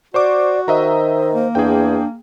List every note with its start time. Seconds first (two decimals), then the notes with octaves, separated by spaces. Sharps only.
0.14 F#4 C5 D5 C#6 D6
0.68 D#3 C5 D#5 E5 A#5
1.33 A#3
1.55 E2 D4 G#4 G5